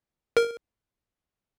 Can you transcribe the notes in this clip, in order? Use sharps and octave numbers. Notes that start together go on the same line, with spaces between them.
A#4